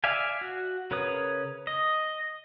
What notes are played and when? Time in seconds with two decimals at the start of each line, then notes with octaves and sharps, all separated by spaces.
0.04 D5 E5 F5 G#5
0.41 F#4
0.91 C#3 A#4 B4 C#5 D#6
1.67 D#5